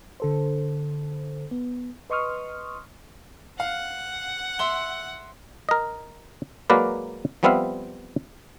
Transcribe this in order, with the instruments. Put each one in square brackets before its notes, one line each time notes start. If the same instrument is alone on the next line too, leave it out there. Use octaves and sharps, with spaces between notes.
[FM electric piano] D3 A4 C5
B3
B4 D#5 C6 C#6 D#6 F6
[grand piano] F5 [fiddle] F#5
[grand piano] E5 C6 G7
[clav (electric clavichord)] A#4 D#5
F#3 G#3 A#3 A#4 B4 D5
F3 G3 B3 C4 E5 F5